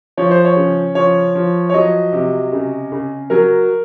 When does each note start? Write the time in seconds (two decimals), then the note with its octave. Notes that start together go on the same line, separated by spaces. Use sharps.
0.17 F3 C#5
0.31 C5
0.45 C#5
0.57 C#3
0.95 F3 C#5
1.35 F3
1.69 C#5
1.74 F#3 D#5
2.13 C3
2.52 C#3
2.92 C#3
3.30 F#3 A#4